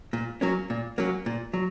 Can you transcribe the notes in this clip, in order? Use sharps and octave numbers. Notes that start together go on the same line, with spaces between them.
A#2
F#3 A#3 C#4
A#2
F#3 A#3 C#4
A#2
F#3